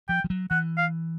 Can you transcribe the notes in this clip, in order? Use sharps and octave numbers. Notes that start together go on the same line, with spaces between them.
F3 G5
F3
F#3
E3 F#5
F5